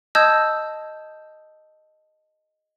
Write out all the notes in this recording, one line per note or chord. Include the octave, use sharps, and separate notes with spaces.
D#5 A5 D#6 E6 G6 G#6